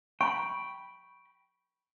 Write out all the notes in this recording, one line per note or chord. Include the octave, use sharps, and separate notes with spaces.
G5 A#5 B5 C#6